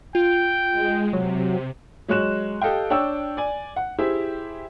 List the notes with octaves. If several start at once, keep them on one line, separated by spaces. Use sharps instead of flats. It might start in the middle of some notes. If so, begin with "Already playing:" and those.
F4 G5
G#3
C3 F#3
F#3 G#3 C#5 F#6 E7
G4 A4 D#5 F5 G5
D4 C#5 G5 E6
D5 G#5
F#5
E4 G4 G#4 C5 E5